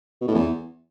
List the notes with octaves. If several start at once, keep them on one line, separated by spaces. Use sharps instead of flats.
B2
A2
E2